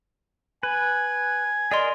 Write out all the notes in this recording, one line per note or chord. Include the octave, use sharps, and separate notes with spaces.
B4 G#5
G#4 A#4 D5 D#5 C6